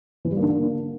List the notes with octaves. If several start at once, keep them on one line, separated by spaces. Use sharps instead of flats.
E3
G3
A#3
D3
A#3